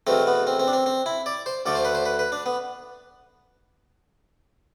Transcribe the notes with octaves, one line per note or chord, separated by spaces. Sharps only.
E2 B2 A3 C4
B3
C4
C4
D4
C4
C4
E4
D5
C5
D2 D3 A3 D5
C5
B4
C5
B4
B4
D4
B3